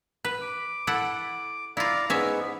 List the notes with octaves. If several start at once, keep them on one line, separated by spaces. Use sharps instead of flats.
B4
D6
E4 A4 F#5
E4 F4 D5 F5 A#5
G#2 B3 C#4 E5